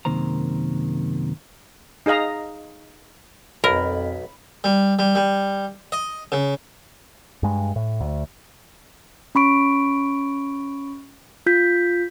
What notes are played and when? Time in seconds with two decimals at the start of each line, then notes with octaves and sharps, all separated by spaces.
0.05 F#2 C3 D#3 A#3 C5 A#5
2.06 D#4 G#4 D#5 F5 A#5
3.64 B1 F2 A#4 B5
4.64 G3
4.99 G3
5.15 G3
5.92 D#5
6.32 C#3
7.43 G2 G#3
7.76 A2
8.00 D2
9.35 C#4 B5 C#6 D7
11.46 F4 G6 B6